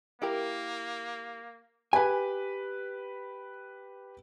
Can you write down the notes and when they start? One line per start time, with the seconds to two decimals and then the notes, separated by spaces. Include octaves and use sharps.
0.22 A#3 E4 G4 A#4
1.93 G4 B4 G#5